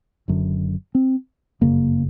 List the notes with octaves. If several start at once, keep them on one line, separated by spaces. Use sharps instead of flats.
F#1 F#2 D3
C4
G1 F#2 C#3 A#3